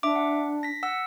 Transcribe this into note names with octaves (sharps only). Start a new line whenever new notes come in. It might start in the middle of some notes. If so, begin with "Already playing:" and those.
D4 E5 D6
F#5
A#6 B6
F#5 E6